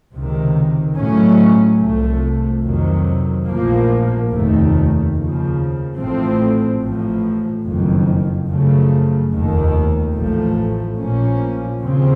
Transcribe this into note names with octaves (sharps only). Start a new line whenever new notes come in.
C#2 C3 D#3
A2 F#3 A3 C#4
C2 C3 F3 A3
F2 C3 D#3 F#3
A#1 A2 F3 A#3
F1 D#2 D#3 A3
D#2 C#3 F3
A1 A2 F3 A3 C4
A1 A2 F3
F#1 F2 D#3
F#2 C#3 F3 A3
F1 D#2 D#3
A1 A2 F3 A3
A#1 A#2 F3 A#3 C#4
D#2 C#3 F3 C4